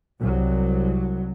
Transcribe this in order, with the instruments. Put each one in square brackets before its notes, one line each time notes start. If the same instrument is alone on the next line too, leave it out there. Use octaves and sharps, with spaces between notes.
[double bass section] C2 F#3